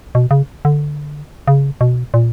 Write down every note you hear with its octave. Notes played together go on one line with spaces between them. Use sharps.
B2
C#3
D3
C#3
B2
A#2